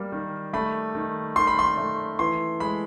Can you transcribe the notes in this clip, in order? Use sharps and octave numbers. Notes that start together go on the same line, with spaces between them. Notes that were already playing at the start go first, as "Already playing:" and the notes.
Already playing: G3 A#3
D#3
A3 B5
D#3
D#3 C6
B5
C6
A3
E3 C6
G#3 B5